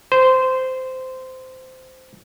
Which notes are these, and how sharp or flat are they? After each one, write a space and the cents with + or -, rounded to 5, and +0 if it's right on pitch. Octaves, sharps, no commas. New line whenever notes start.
C5 -15